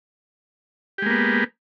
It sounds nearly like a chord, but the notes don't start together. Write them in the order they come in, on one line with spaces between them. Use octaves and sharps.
G4 G#3 A#3 B3